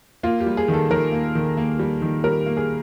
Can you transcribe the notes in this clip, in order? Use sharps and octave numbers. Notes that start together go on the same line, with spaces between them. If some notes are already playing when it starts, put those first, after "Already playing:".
A#3 F4
G4
G3
G#4
D#3
A4
D#3 A#4
A#3
D#3
A#3
G3
D#3
G3 A#4
A#3
G#4